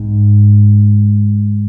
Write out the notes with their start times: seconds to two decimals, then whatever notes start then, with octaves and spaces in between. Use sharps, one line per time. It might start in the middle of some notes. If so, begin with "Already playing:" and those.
Already playing: G#2